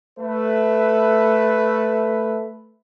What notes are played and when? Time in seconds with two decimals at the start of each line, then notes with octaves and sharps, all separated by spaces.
0.20 A3 B4